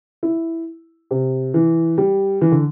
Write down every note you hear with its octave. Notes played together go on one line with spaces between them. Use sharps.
E4
C3
E3
G3
E3
D3